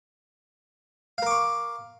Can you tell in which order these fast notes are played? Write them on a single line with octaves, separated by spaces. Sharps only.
F5 A#4 D6 C#6